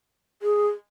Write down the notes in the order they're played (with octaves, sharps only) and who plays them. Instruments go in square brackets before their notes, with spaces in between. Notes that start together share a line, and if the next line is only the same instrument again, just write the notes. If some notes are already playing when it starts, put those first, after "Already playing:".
[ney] G#4